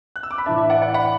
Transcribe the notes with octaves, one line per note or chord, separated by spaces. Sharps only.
F#6
E6
D6
B5
A2 E3 D4 E5 A5
E5
D5 F#5
D5 F#5
F#5 B5